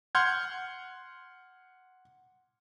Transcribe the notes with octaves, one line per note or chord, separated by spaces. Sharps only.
F#5 C6 F6 G6 G#6